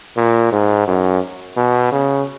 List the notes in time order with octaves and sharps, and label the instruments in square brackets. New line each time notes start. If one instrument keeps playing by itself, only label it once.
[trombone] A#2
G#2
F#2
B2
C#3